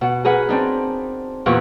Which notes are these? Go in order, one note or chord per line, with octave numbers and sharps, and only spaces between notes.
B2 F#5
G#4 A#4 B4 F#5
C4 D4 D#4
E2 A#2 G4 A#4 B4 C#6